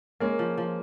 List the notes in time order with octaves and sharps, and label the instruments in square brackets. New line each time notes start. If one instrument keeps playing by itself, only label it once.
[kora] G#3 [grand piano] A#3 C#4
[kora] F3
F3